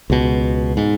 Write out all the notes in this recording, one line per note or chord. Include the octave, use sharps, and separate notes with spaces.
C#2 B2
G#2